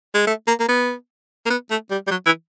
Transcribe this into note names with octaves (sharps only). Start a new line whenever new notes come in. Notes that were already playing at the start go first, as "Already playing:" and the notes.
G#3
A3
A#3
A#3
B3
A#3
B3
A3
G3
G3
F#3
E3